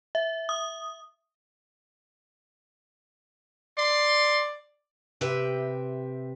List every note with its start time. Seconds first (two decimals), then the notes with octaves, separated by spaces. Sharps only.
0.15 E5
0.49 D#6
3.78 D5 C6
5.21 C3 G4 B4 E5 G5